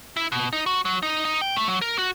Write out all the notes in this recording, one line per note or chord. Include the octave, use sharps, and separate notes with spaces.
E4
B2
D#4
F#4
F#3
D#4
D#4
G5
A3
F#3
A#4
F#4